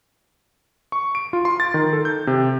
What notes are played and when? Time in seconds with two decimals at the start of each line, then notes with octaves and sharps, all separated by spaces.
0.92 C#6
1.15 D7
1.33 F4
1.45 C6
1.60 A6
1.74 D#3
1.93 A4
2.05 G6
2.27 C3